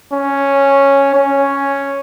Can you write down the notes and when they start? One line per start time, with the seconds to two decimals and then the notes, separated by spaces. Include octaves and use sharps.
0.12 C#4
1.15 C#4